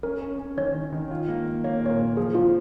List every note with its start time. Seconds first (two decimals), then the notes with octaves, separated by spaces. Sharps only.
0.03 C#4 A#4
0.21 C#4
0.39 C#4
0.57 D#3 C#5
0.75 D#3
0.92 D#3
1.11 F4
1.28 A#3
1.46 A#3
1.64 A#3 C#5
1.82 A#2 C#5
1.90 A#4
1.99 A#3
2.17 F3 G#4
2.35 F3 F4